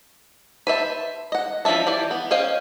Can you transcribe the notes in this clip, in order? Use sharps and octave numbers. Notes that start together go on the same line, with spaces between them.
B4 C5 E5 A5
D#5 F#5
E3 F3 C#4 E5 A5
E3 G4 D5
B3
C#4 C5 D#5 F5 G5